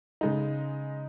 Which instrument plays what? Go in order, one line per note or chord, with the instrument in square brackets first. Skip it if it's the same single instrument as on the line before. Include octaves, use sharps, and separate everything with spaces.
[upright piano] C#3 G#3 D#4